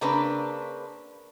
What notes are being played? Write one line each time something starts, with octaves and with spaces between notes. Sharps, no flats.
C#3 A#3 C4 D4 B4